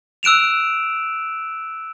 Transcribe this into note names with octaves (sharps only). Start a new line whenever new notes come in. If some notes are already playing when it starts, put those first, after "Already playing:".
E6 F#6 D7 E7 F7